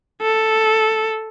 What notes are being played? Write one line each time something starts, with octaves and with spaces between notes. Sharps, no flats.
A4